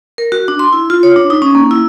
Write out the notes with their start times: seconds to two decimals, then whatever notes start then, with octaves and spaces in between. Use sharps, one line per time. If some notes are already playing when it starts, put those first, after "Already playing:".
0.18 A#4
0.32 F#4
0.48 D4
0.59 C6
0.73 E4
0.90 F4
1.03 C#5
1.16 D4
1.30 D#4
1.42 C#4
1.55 A#3
1.71 E4